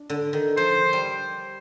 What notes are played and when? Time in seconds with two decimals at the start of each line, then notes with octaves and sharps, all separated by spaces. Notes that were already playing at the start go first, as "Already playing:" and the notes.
Already playing: D4
0.10 D3
0.33 D#3
0.57 F3 C5
0.93 G3